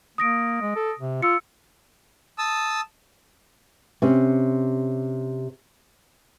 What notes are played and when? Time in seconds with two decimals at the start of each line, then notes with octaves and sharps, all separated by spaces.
0.18 A#3 D#6 A#6 D7
0.61 G#3
0.76 A4
0.99 C3
1.23 F4 E6 C#7
2.38 A5 D#6 E6
4.02 C3 C#4